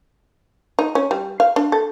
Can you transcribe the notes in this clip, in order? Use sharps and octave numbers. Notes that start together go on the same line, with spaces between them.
D#4
C#4
G3
F5
D4
A4